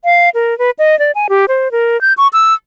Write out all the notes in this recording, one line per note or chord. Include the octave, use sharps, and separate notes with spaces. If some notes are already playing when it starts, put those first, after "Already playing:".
F5
A#4
B4
D#5
D5
G#5
G4
C5
A#4
G6
C#6
E6